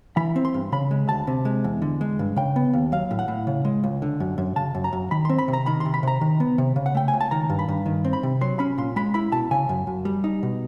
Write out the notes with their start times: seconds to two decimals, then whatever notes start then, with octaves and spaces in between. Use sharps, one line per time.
0.17 E3 B5
0.36 C4
0.45 C6
0.54 G2
0.72 C#3 B5
0.91 G#3
1.09 D2 A5
1.27 C3
1.45 G#3
1.64 E2
1.82 D3
2.01 G#3
2.19 G2
2.36 C#3 G5
2.56 B3
2.73 D#2
2.92 F#3 F5
3.11 A2
3.19 F#5
3.28 A2
3.47 C#3
3.65 G#3
3.84 C#2
4.02 D3
4.20 F#2
4.38 F#2
4.56 C#3 A5
4.75 F#2
4.84 A#5
4.93 F#2
5.11 D#3 B5
5.25 C4 C6
5.38 B5
5.48 C3
5.53 A#5
5.66 D#3 B5
5.80 C3 C6
5.94 B5
6.03 C3 A#5
6.21 D#3
6.40 B3
6.58 C3
6.76 C#3
6.86 F#5
6.95 A3 G5
7.08 G#5
7.14 C#2
7.21 A5
7.31 D#3 A#5
7.50 G2
7.59 B5
7.68 G2
7.86 D#3
8.05 C4
8.13 B5
8.23 C3
8.41 F#3 C6
8.59 C#4 B5
8.78 A#2 C6
8.96 G#3 B5
9.14 E4 B5
9.32 B2 A5
9.51 C#3 G#5
9.69 F#2
9.87 F#2
10.05 G3
10.24 D#4
10.43 B2